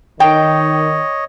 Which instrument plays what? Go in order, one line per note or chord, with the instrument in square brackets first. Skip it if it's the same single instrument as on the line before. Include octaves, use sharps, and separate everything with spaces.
[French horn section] D#3 [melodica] C#5 D#5 [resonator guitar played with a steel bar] G5